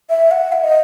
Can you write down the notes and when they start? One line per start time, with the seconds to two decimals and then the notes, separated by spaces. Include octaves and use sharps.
0.10 E5
0.31 F#5
0.52 E5
0.64 D#5